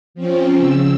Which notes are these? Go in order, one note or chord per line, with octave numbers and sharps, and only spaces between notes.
F3 C4 C#4
C#3 E6